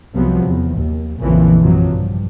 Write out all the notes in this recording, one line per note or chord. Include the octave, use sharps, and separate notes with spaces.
C2 C3 F3 F#3 B3
E2
D#2
A#1 F2 A#2 C#3 E3 F3
F#2 C3 F3 F#3
G2